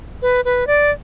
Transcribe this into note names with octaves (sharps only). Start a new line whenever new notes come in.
B4
B4
D5